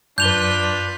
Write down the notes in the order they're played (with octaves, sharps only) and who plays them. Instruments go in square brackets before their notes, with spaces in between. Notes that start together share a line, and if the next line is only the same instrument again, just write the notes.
[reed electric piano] F#2 [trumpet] D4 [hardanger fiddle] F4 B4 [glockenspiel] G6 F7 G7